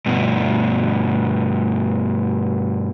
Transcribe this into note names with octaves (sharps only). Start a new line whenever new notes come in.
G2 B2